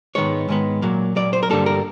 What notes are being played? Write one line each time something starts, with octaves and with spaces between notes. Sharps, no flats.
G#2 D#3 G#3 B3 C#5
G#2 D#3 G#3 B3
A#2 F#3 A#3
A#2 F#3 A#3 D5
C5
A#4
G2 D3 G3 A#3 A4
A#4